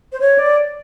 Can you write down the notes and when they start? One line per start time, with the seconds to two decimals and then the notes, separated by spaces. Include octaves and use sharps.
0.13 C5
0.20 C#5
0.39 D5